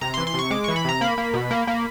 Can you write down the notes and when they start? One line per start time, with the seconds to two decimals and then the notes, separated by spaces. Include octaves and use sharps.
0.01 C3 A#5
0.14 E3 C6
0.27 C6
0.34 C3 C#6
0.50 G#3 D6
0.64 E3 C#6
0.76 B5
0.84 C3 A#5
1.01 A#3 B5
1.18 A#3
1.34 B2
1.51 A#3
1.67 A#3